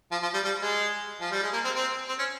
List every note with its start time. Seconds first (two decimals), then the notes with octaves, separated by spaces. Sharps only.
0.11 F3
0.22 F3
0.34 G3
0.44 G3
0.61 G#3
1.21 F3
1.31 G3
1.43 G#3
1.53 A#3
1.64 C4
1.76 C4
2.08 C4
2.18 C#4